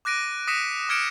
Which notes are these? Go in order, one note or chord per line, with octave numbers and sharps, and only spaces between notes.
D6 F#6 A#6 D7 D#7
D#6 A#6 B6 C#7 D#7 E7
D6 F6 G#6 C#7 D7 E7